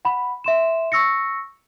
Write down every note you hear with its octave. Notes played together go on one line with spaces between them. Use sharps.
F#5 B5
E5 C6 E7
C#6 E6 A#6 C#7